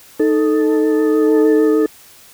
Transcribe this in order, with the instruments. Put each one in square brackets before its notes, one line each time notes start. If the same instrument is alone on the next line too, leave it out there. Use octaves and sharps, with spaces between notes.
[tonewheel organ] D#4 A4